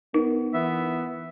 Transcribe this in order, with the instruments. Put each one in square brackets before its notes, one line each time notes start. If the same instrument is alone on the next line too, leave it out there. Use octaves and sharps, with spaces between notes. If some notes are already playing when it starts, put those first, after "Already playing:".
[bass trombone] B3 [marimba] D#4 A#4
[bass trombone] E3 [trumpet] B3 [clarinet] E5